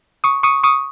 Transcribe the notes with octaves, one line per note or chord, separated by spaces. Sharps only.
C#6 D#6
C#6 D#6
C#6 D#6